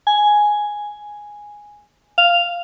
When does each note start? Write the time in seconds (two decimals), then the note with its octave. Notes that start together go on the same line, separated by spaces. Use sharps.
0.07 G#5
2.18 F5